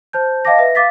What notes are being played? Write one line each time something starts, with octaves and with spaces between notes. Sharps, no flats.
C5 A5 G6
D#5 F5 G5 A5 D6 A#6
B4 E5 A#6
F5 D6 A6 B6